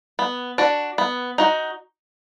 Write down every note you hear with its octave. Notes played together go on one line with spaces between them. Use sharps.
B3
D4 F#4
B3
D#4 F#4